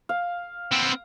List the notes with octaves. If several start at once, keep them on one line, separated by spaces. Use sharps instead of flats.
F5
B3 C4